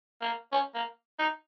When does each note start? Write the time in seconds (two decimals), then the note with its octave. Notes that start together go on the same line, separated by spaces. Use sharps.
0.22 A#3
0.52 C#4
0.75 A#3
1.19 D#4